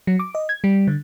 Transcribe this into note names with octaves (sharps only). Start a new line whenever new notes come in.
F#3
D6
D#5
G#6
G3
D3